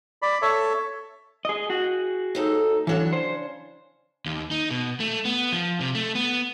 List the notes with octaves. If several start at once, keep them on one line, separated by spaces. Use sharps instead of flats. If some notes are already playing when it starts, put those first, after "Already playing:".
D5 B5
A4 C#5 E5
G#4 D#5
F#4 G#4
D#2 D#4 A4
C#3 E3 F#3 D4 C#5
C5
D#2
D#4
B2
A3
B3
F3
C3
A3
B3